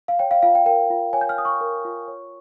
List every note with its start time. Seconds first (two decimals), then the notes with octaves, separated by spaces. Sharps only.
0.08 F5
0.19 C#5 G5
0.31 F5
0.42 F4 F5
0.55 G5
0.66 A#4 G5
0.90 F4
1.13 C#5 G#5
1.21 G6
1.29 F6
1.37 F4 D#6
1.45 C#6
1.61 A#4
1.85 F4
2.08 C#5